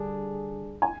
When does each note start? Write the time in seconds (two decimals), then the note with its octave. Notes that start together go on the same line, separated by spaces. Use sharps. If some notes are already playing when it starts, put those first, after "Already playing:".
Already playing: D3 G3 D4 G#4
0.82 G#5